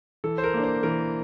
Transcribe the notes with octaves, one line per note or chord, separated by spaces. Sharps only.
E3 A4
C5
A#4
A#3 D4
C5
E3 A#4